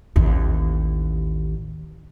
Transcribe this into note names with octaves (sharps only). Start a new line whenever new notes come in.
A1 D#2